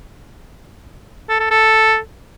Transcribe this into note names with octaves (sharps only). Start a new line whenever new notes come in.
A4
A4
A4